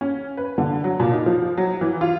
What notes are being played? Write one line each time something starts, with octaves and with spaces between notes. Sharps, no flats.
C#4
B4
D3
F#3
A#2
D#4
F3
F#3
E3
F4